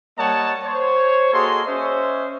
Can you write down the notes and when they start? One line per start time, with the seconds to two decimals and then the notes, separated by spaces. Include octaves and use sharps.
0.17 G3 A#3 C#5 D#5 F#5 A5
0.63 C5 C#5
1.33 A#3 F#4 G#4 A4 D#5 C6
1.66 C#4 C5 C#5 D#5 E5